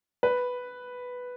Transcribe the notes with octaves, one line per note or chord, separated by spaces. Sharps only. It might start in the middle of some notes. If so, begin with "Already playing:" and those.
B4